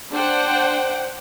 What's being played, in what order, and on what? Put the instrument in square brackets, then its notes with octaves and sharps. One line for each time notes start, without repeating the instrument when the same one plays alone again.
[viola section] D4 C5 F#5 G5